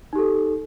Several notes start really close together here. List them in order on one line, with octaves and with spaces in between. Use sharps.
D#4 G4 A4